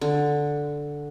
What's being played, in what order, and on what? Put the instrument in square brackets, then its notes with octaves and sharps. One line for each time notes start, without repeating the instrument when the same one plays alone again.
[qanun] D3